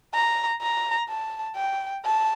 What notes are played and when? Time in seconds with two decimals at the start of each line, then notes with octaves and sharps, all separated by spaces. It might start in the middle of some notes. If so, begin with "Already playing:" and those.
0.14 A#5
0.61 A#5
1.09 A5
1.56 G5
2.05 A5